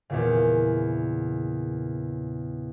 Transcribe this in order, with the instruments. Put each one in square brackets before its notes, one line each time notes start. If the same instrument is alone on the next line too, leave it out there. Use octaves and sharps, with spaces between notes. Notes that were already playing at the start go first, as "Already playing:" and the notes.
[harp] E2 A#2 C#3